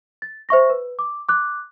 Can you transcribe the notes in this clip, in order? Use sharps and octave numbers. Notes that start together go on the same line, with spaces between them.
A6
C5 E5 C#6 A#6
B4
D6
D6 F#6